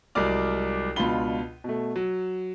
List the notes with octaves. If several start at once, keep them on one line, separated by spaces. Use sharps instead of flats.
C2 F#3 G#3 D5 D6 F6
C#2 B2 D4 F4 B5 G7
B2 A3
F#3